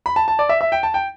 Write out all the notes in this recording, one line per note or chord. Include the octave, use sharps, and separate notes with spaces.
B5
A5
A5
D5
E5
E5
G5
A5
G5